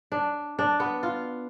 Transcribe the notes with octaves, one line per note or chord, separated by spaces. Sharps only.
D4
D4
B3
F4